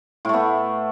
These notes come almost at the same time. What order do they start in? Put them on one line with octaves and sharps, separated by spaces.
A2 A3 B3